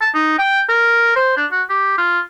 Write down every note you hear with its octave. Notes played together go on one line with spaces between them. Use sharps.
A5
D#4
G5
A#4
C5
D4
F#4
G4
F4